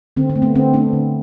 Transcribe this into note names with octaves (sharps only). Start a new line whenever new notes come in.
D3 C4
C4
A3
B3
D3 C4
A3 B3 D4
D3